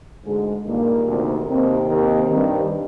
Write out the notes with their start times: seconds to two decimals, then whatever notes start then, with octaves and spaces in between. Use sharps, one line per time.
0.25 D2 G#2 D3 G#3
0.66 G2 A#2 D#3 A#3
1.07 D2 C3 D#3
1.48 D#2 C3 D#3 C4
1.89 D#2 D#3
2.29 G2 D#3